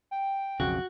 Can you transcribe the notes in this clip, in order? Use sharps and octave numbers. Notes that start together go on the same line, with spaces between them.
G5
B1 F2 C#3 F#4